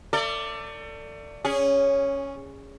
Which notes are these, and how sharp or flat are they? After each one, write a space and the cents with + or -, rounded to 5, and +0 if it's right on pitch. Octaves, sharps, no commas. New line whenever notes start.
A3 +30 A4 +35 D5 +0
C#4 +0 G#4 -20